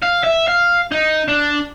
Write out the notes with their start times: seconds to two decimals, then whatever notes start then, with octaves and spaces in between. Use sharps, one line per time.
0.02 F5
0.23 E5
0.48 F5
0.92 D#4
1.28 D4